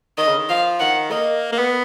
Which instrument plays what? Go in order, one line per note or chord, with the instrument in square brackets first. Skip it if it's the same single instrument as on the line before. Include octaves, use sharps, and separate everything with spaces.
[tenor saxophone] D#3 [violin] D#5
[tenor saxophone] C#3
D#3
[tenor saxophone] F3 [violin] F5
[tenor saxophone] D#3 [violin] F#5
[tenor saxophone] A#3 [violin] D#5
[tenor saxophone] A#3
B3